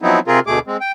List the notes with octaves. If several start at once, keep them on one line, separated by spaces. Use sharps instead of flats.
F3 F#3 B3 C4 D#4 E4
C3 C4 F4 G#4 A#4
D2 B2 A3 G#4 D6
G#3 C4
G5